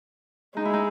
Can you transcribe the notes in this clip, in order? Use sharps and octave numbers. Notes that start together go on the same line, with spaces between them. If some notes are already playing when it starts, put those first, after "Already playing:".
G#3 D#4
E4
D#4